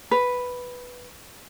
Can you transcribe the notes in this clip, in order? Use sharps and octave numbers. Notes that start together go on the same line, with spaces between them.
B4